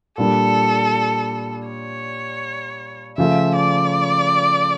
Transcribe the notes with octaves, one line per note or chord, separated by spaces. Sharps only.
A#2 G3 D4 A4
C#5
C#3 F3 A3 E5
D5